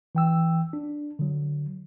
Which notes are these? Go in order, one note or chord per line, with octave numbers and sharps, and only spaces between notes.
E3 G5 E6
D4
D3 F#3